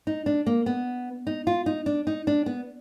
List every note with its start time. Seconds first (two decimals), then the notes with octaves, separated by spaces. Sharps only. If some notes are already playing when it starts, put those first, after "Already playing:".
0.07 D#4
0.26 D4
0.46 A#3
0.66 B3
1.27 D#4
1.47 F4
1.66 D#4
1.86 D4
2.07 D#4
2.27 D4
2.46 B3